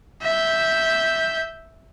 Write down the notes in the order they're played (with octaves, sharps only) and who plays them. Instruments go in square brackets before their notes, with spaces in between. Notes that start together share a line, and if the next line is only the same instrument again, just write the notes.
[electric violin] E5 G6